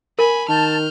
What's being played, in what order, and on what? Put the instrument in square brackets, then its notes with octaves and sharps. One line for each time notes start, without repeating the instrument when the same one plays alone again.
[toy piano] A#4 [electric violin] G#5 B5
[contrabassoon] D#3 [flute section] A5 [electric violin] F6 G6